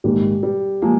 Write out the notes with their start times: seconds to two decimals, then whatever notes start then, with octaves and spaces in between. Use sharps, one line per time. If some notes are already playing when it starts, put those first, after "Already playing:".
0.04 A#1 G#2 D#3 G3 A#3
0.43 G3
0.82 F3 G#3 A#3